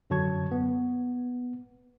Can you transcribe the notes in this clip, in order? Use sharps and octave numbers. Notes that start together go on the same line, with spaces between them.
F#2 D3 F#3 A5 C#6 G#6
B3